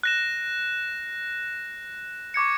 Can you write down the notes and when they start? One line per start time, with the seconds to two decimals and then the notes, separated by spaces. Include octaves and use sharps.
0.03 F#6 A#6 E7
2.34 C#6 D6 G#6 C#7